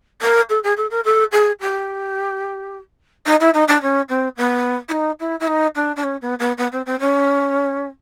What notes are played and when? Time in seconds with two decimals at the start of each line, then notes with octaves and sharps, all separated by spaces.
0.22 A#4
0.49 A4
0.63 G#4
0.77 A4
0.90 A#4
1.04 A4
1.32 G#4
1.60 G4
3.26 D#4
3.40 E4
3.54 D#4
3.68 D4
3.82 C#4
4.09 C4
4.37 B3
4.88 E4
4.91 D#4
5.19 E4
5.40 E4
5.47 D#4
5.75 D4
5.96 D4
6.03 C#4
6.21 B3
6.39 B3
6.57 B3
6.72 C4
6.86 C4
7.00 C#4